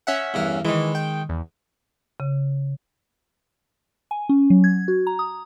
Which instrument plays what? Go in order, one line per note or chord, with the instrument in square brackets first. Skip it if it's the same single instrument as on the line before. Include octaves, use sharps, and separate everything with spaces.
[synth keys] C#4 E5 F#5
[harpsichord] E2 G2 A#4
[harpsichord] D#3 G#3 [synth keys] E3
[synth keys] G5
E2
[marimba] C#3
[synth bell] G#5
C#4
F#3
G#6
F#4
A#5
D#6